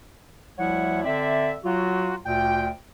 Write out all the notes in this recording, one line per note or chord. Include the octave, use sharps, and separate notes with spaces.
D2 F3 G3 E4 C#5 F#5
D3 C4 D5 E5
F#3 F4 F#4
D2 A#2 G5